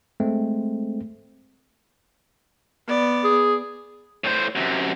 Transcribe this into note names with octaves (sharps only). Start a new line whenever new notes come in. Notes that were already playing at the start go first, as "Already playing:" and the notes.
G#3 A3 C4
B3 D5
G#4
A2 C5
F#2 C3